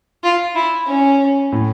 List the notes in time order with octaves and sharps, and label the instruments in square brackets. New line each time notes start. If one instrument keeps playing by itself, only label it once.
[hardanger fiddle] F4
E4
C#4
[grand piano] A2